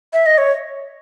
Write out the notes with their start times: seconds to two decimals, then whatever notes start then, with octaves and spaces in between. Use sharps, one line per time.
0.13 E5
0.26 D#5
0.38 C#5